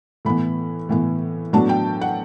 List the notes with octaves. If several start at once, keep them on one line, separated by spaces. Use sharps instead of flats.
A2 E3 B3 B5
A2 E3 B3
A2 F#3 B3 D4 A5
G5
F#5